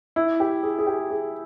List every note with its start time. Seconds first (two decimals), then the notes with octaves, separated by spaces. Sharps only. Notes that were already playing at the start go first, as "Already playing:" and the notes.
0.16 E4
0.40 G4
0.63 G#4
0.79 G#4
0.87 G4
1.10 G#4